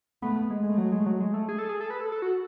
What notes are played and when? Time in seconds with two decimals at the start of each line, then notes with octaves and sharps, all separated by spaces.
0.22 A3 B3
0.35 B3
0.50 G#3
0.64 G#3 A3
0.78 F#3
0.92 G#3
1.06 F#3
1.20 G#3
1.34 A3
1.49 G#4
1.59 A4
1.69 G#4
1.81 A4
1.90 B4
2.01 A4
2.12 A4
2.22 F#4